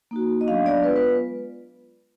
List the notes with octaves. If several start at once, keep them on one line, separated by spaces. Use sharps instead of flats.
A#3 D#4 F#4
D#5
F#3 B3 D4 F5
D5
G#3 B3 F4 B4
B4